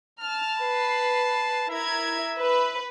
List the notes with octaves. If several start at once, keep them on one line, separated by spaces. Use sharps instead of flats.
A5 F6
B4 C7
E4 A#4 E5 G#6
B4